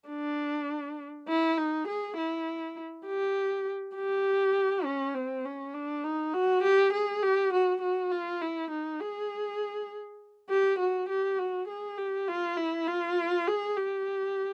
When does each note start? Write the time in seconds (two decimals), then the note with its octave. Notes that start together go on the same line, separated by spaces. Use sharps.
0.09 D4
1.28 E4
1.57 D#4
1.88 G#4
2.17 E4
3.06 G4
3.95 G4
4.85 C#4
5.14 C4
5.45 C#4
5.74 D4
6.04 D#4
6.34 F#4
6.63 G4
6.93 G#4
7.22 G4
7.53 F#4
7.82 F#4
8.11 F4
8.41 E4
8.71 D#4
9.01 G#4
10.49 G4
10.79 F#4
11.09 G4
11.38 F#4
11.68 G#4
11.98 G4
12.28 F4
12.57 E4
12.87 F4
13.47 G#4
13.77 G4